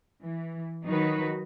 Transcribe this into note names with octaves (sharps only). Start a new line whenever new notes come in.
E3
D#3 F#3 D#4 F#4 B4